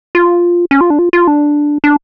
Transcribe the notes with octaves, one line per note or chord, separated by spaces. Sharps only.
F4
C#4
F4
D4
F4
F4
D4
D4